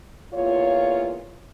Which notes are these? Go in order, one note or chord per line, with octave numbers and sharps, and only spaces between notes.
E2 A#2 F4 C#5